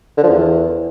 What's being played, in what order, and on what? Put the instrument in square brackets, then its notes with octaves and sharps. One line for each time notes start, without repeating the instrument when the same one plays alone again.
[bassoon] D3
F3
E2